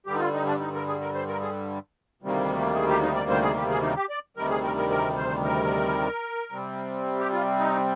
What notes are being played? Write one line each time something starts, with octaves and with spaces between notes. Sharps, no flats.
G2 D3 G3 G4
D#4
F4
D#4
D4
D#4
A#4
G#4
A#4
C5
A#4
G#4
D2 C3 D#3 G3 A#3
G#4
G4
D#4
D5
C5
G#4
G4
G#4
D#4
G4
D5
D2 C3 D#3 G3 A#4
G#4
A#4
A#4
A#4
C5
A#4
C3 G3 C4
G4
F4
D#4